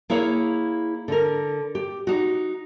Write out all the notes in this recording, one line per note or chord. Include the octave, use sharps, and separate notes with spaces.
A#3 E4 G#4 C#5 F5
D3 A#4
G4
D#4 F#4